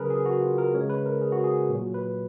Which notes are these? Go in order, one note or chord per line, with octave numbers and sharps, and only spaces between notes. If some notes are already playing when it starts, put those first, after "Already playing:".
Already playing: C#3 F#3 G#4 A#4 B4
G#4
F#4
F4
A#4
C#3 G#3 C#5
B4
A#4
G#4
F#4
G#4
A#2 F#3
B4